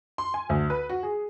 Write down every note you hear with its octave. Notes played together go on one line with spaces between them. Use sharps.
C6
G#5
D2
B4
F#4
G#4